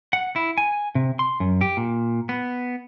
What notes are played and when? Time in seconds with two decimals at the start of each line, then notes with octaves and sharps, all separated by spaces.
0.13 F#5
0.36 E4
0.58 G#5
0.95 C3
1.19 C6
1.40 F#2
1.61 G4
1.77 A#2
2.29 B3